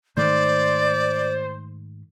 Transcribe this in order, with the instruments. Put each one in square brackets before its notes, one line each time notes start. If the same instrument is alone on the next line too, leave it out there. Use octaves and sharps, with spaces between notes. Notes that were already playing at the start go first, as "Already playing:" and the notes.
[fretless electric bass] G#2 D#3 A3 [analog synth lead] C5 [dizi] D5